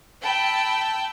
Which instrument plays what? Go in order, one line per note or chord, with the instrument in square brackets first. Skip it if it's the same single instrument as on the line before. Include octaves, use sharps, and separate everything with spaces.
[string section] G5 A5 B5 E6